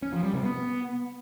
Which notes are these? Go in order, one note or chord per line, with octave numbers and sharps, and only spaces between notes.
C#4
F3
G3
C3
B3